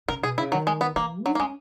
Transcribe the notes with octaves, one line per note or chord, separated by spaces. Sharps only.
C#3 A#4
B2 G#4
C#3 E4
D#3 F#3
G#3
B3
E3 A#3
F#3 D#4
A#3
G#3 C#4